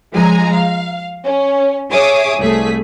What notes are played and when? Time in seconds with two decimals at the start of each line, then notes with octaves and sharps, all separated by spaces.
0.13 F3 G#3 G#5 A#5
0.53 F5
1.24 C#4
1.92 G#4 C#5 E5 G#5 D6 D#6
2.40 C2 A3 G#4 B6